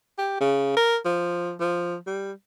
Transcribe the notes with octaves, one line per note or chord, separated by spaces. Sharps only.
G4
C#3
A#4
F3
F3
G3